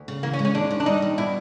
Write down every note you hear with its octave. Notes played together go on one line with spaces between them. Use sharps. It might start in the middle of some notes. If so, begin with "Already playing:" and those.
Already playing: D2
C#3
E3 A#3
C#4
G#3
C#4
D#2 D4
D#3
D4
G3 D#4
D#2
B2 E4